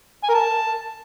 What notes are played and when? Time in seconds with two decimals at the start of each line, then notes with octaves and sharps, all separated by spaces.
0.24 G#5
0.29 A#4
0.34 A5